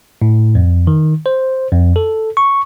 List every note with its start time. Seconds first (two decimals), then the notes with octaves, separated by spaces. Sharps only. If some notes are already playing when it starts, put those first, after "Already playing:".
0.22 A2
0.55 F2
0.87 D#3
1.26 C5
1.72 F2
1.96 A4
2.37 C#6